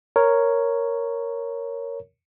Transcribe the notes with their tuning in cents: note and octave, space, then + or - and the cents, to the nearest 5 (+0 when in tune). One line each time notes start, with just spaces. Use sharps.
A#4 +0 C#5 +0